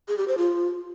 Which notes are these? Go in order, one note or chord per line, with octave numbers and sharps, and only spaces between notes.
G#4
G4
C5
F4